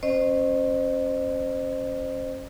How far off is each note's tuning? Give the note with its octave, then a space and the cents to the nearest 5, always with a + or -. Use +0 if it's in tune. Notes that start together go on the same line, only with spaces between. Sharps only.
C#4 -25 C5 -5 D#5 -30